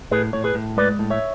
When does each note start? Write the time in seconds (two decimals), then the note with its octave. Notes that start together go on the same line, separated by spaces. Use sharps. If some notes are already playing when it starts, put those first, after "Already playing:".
0.11 A2 G#4 B4
0.33 A2 C#5
0.44 G#4 B4
0.55 A2
0.77 G#3 B4 D5
0.99 A2
1.10 C#5 E5